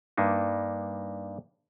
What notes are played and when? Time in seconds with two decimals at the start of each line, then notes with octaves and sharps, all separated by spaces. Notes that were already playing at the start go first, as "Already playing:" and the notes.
0.17 G2 A#3 D4 D#4